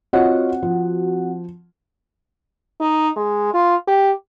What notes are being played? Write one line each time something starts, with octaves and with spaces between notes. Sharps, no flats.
C4 F4 F#4 C#5 D#5 F#5
F3
D#4
G#3
F4
G4